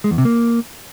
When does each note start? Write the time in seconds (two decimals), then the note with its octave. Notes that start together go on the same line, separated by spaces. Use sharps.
0.04 G#3
0.11 E2
0.18 C3
0.25 A#3